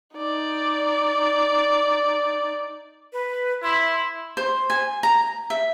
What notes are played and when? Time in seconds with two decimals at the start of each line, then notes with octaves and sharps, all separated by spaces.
0.15 D#4 D5
3.13 B4
3.63 E4 C6
4.37 C5
4.70 G#5
5.03 A#5
5.50 E5